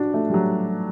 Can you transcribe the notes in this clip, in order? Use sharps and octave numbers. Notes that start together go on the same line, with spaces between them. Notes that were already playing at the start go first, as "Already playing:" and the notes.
Already playing: D4 F#4
A3
G3
F#3